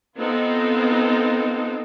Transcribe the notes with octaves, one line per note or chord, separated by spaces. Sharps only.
B3 C4 D#4 F4 A4